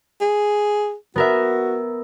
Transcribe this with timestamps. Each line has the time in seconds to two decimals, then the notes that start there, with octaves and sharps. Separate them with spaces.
0.21 G#4
1.16 B3 F#4 A#4 E5